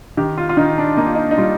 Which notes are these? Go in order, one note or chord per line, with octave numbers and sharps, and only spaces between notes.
D#3 G4
F4
F4
D#3 D#4
D4
A#3 D#4
F4
D#4
D#4
G3 F4